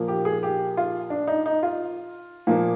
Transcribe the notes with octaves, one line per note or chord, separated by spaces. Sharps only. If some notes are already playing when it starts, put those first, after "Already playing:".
Already playing: A#2 F3 A#3
G4
G#4
G4
F4
D4
D#4
D#4
F4
A#2 F3 A#3